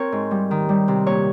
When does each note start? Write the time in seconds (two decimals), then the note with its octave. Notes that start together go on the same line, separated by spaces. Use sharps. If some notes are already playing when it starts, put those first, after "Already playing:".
Already playing: C4 A#4 C#5
0.12 G#2
0.31 G3
0.51 D#3
0.69 G3
0.88 C3
1.07 A#2 C#5